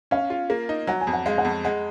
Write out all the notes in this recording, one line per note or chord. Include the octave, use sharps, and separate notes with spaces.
C#4 F5
F4
A#3
D#4
F#3 F#5
G#5
F2
F#5
G#3 F5
F#5
F2
G#3 F#5